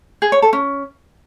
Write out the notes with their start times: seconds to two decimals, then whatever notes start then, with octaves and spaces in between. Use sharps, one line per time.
0.22 G#4
0.32 C#5
0.42 A4
0.53 C#4